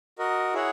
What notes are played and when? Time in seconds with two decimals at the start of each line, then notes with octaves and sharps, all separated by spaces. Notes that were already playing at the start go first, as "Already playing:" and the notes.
0.19 F#4 A#4 D#5
0.53 E4 G#4 C#5 F#5